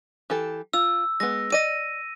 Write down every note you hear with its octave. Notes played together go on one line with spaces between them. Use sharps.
E3 G4 A4
F4 E6
G#3 B3 A#6
D5 D#5 A#6 D#7